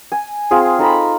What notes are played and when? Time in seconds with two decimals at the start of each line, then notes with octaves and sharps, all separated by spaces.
0.12 G#5
0.51 C4 F4 G#4
0.79 D#4 A4 A#5 B5